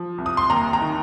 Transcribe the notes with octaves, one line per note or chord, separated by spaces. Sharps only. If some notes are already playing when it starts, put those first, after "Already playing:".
Already playing: F3
C2
D#6
C6
D#2 A#5
A#5
D#3